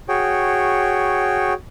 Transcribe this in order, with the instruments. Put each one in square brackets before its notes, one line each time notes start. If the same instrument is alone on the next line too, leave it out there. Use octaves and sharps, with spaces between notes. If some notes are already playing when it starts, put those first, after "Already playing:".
[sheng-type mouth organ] F#4 G#4 C#5 G5